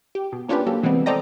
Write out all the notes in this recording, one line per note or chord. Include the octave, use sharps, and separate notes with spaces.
G4
B2
A#3 C#4 D4 F4 G4 B4
F#3 A#3 G4 A4
C3 E3 G3 G#3 B3 C4
A4 C5 D5 D#5 G5 A#5